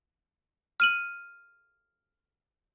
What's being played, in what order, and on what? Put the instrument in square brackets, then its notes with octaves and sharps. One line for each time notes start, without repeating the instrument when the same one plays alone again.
[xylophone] F6 D#7 F#7